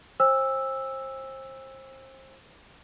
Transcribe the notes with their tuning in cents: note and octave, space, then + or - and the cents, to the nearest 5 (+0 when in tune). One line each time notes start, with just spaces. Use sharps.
C5 +30 G#5 -45 E6 +0